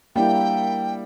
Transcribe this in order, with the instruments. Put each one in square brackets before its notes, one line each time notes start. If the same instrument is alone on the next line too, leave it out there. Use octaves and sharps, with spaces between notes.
[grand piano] G3 [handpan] A#3 D4 E4 [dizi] G5